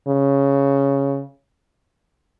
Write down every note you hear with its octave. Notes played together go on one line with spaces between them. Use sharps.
C#3